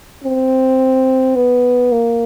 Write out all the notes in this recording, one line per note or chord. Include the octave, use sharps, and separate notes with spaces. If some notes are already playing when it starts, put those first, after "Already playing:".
C4
B3
A#3